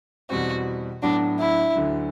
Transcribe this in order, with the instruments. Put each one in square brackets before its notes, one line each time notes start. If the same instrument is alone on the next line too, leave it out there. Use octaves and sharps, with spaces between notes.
[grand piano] E2 B2 G3 C4 [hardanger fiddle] F#4
[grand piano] A2 F#3 B3 F#4 [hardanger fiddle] D4
[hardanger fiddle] E4
[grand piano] D2 D3 F#3